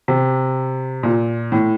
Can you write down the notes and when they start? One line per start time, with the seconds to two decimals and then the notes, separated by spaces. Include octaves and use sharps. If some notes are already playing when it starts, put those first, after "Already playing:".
0.08 C3
1.03 A#2
1.52 A2